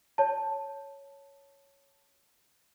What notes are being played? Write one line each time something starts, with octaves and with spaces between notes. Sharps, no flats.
C#5 A5